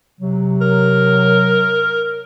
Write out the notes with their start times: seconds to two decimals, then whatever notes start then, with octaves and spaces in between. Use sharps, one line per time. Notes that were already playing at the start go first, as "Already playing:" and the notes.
0.20 C3 F#3
0.61 A#4